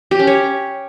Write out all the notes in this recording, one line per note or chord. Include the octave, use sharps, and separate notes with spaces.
G4
C#4
C#5